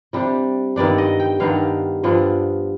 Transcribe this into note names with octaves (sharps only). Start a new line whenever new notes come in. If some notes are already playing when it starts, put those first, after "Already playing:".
C3 G3 D4
G2 D#3 B3 D4 D5
D#5
G5
G2 D#3 B3 D4 F5
G2 F3 B3 D4